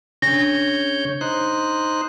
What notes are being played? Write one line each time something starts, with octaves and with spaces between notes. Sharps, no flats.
C#3 D4 C#5 G6 A#6
D#4 C5 F#6